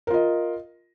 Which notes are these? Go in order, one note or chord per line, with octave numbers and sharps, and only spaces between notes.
F4 A#4 D#5